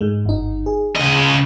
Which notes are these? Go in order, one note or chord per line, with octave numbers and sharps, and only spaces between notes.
G#2 G#3
G1 D#4
G#4
C#3 D#5